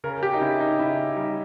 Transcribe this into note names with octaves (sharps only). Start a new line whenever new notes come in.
C#3 A#4
G4
D#4
C#3 E4
D#4
C#3 E4
G3 D#4